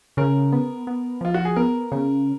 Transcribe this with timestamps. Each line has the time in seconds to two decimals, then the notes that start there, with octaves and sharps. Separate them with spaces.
0.17 C#3 A#4
0.53 B3
0.87 B3
1.21 F3 F4
1.34 F#4
1.45 G#4
1.56 B3 A#4
1.92 C#3